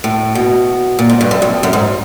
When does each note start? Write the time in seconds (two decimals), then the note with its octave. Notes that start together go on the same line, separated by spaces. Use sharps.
0.04 A2
0.35 B2
0.99 A#2
1.10 G#2
1.21 G2
1.31 F#2
1.42 F2
1.63 F#2
1.73 G#2